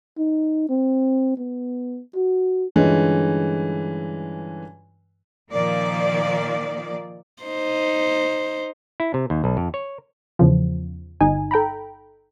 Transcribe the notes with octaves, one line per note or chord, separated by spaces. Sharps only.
D#4
C4
B3
F#4
G2 D3 E3 G#3 C#4 F4
A#2 D#3 F3 A#3 D5
D#4 C5
E4
C3
D#2
B1
F2
C#5
E2 C#3 F3
G1 D#4 G#5
A4 G5 A#5 B5